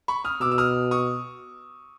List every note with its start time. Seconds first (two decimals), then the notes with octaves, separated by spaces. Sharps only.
0.08 B5 C#6
0.24 D#6 F6
0.41 B2 D6 E6
0.51 E6
0.58 D#6 F6
0.91 C#6 D#6